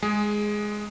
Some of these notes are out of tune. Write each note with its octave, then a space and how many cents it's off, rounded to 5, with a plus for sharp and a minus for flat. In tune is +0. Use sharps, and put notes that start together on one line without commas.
G#3 +5 G#4 +0